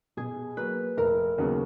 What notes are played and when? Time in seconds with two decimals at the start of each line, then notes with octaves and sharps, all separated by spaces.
0.17 B2 G#4
0.57 F#3 A#3 B4
0.97 F1 A#4
1.38 D#2 C#3 F#3 B3